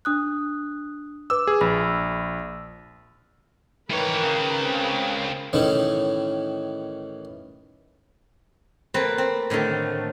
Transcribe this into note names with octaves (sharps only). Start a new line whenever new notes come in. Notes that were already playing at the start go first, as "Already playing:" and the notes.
D4 D#6 F#6
B4 D6 E6
G#4
A#1 B5
D#3 E3 A#4 B4 C#5
C#2 C#3
C4
A2 D#3 E3 C#4
A3 A#3 C4 B4
C4
A2 D3 D#3 A3